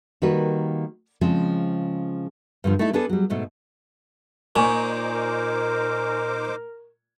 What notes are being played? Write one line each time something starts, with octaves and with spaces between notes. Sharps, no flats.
D#3 G3 A#3 F#4 B4
C#3 F3 G#3 C4
G2 D3 F3
A3 D#4 E4 A4
B3 D4 G#4 A4
F#3 G3
G#2 B2 A3
A#2 D#4 C5 G#5 C#6 D6
A#4